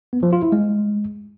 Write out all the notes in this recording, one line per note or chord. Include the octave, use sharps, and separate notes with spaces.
B3
F3
F4
E4
G#3